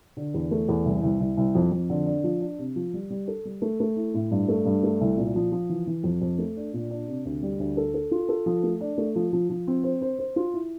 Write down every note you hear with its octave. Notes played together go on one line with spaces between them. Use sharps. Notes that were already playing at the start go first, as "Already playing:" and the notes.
D3
E2
A3
E2
C2
C2
C2
C2
F2
F2
D3
D4
F3
D4
C3
F3
G3
G3
A4
G3
A3
A3
E4
A2
G2
A3
G2
A3
C2
A#2
F3
F3
E3
E3
F2
F2
A3
D4
A#2
D4
C3
D2
G3
D2
A4
A4
F4
A4
F3
A3
D4
A3
F3
F3
F3
C4
C5
C5
C5
F4
E4